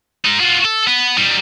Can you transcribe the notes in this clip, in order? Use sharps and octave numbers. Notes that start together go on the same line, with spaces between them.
G#3 D#4
F4 F#4
A4
B3
G3 D#4